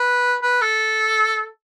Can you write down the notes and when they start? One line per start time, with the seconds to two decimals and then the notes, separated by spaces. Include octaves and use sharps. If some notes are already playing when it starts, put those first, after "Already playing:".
Already playing: B4
0.42 B4
0.61 A4